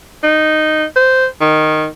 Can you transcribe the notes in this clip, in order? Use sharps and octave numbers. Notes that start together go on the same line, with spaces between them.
D#4
C5
D#3